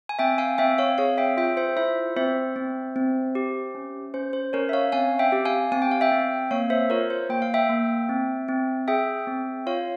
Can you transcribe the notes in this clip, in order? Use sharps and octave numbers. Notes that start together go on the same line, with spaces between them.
G#5
C4 E5 G5
F5 G#5
C4 E5 G5
C#5 F5
G#4 C#5 F5
E5 G5
F4 E5 G5
C5 E5
E4 C5 E5
C4 C5 E5
C4
C4
G4
C#4
C#4 C5
C5
C#4 A#4 C#5
E5
C#5 F5
C4 F5 G#5
E5 G5
G4
F5 G#5
C4 G#5
G5
F5
E5 G5
C4
A#3 C#5 F5
C5 E5
F4 A#4 C#5
C5
A#3 G5
F5
E5 G5
A#3
C4
C4
G#4 E5 G5
C4
F4 C#5 F5